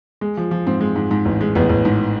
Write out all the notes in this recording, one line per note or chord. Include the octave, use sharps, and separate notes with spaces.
G#3
F3
F3
G#2 C4
G#3
G#2
G#2
A1
G#3
A1 B3
A1
G#2